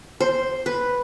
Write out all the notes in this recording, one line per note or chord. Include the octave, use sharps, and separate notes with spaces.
C5
B4